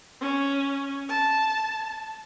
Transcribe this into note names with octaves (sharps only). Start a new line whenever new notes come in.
C#4
A5